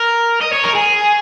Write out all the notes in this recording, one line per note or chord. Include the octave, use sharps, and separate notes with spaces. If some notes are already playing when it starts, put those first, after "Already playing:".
Already playing: A#4
D#5
C#5
A#4
G#4